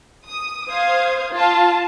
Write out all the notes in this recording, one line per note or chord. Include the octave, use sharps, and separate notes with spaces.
D#6
C5 F5 D#6 G#6
F4 A5